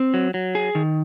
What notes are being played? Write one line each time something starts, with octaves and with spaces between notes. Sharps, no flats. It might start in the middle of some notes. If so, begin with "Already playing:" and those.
Already playing: C4
F#3
F#3
G#4
D#3